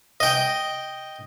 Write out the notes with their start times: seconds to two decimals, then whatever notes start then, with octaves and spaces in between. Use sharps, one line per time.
0.20 D#5 G5